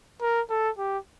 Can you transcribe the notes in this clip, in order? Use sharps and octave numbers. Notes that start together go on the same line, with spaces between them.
A#4
A4
G4